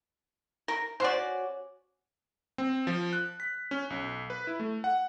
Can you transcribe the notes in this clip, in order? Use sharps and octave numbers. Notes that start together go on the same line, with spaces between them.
A#4
C#4 F#4 C5 D5 G#5
C4
F3
F#6
B6
C#4
B1
B4
E4
A3
F#5